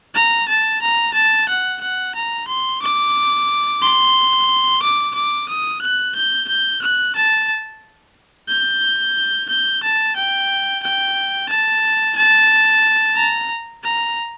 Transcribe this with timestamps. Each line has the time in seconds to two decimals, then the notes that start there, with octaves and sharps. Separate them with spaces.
0.15 A#5
0.48 A5
0.82 A#5
1.14 A5
1.49 F#5
1.81 F#5
2.15 A#5
2.48 C6
2.82 D6
3.82 C6
4.83 D6
5.15 D6
5.49 D#6
5.82 F#6
6.15 G6
6.48 G6
6.82 F#6
7.16 A5
8.49 G6
9.49 G6
9.83 A5
10.16 G5
10.83 G5
11.49 A5
12.16 A5
13.16 A#5
13.84 A#5